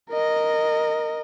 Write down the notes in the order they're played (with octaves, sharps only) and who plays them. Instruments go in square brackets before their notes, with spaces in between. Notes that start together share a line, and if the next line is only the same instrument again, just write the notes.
[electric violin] A#4 D#5